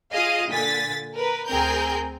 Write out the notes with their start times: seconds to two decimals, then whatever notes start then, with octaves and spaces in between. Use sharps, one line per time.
0.12 F4 G#4 D#5 F5 D#6
0.51 A#2 D3 G#5 A6 B6
1.14 A#4 B4
1.48 D2 C4 G#4 A#4 G5 G6